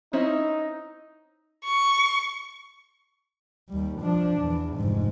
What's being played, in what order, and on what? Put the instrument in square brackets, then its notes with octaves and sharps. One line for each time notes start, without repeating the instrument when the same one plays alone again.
[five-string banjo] C4 C#4 E4 [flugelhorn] D#4
[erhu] C#6
[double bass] D#2 G3
F3 D4
E2
F1 G#2